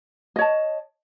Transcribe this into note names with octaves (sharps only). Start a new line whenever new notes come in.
C#5 D#5 A5